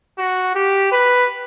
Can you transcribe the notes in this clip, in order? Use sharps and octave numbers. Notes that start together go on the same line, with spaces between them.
F#4
G4
B4